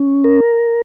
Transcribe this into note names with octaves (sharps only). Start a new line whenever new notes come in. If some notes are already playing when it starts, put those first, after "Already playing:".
Already playing: C#4
A#4